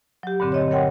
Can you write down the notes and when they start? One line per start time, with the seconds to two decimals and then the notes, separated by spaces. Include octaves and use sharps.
0.23 F#3 G4
0.40 G2 A#2 D3 C4
0.52 C#5 D#5
0.71 A#4 C#5 F#5 G5 C6